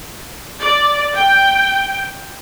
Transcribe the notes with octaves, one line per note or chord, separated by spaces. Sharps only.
D5
G5